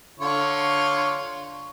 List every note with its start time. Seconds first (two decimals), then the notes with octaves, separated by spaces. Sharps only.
0.19 D3 F4 C#5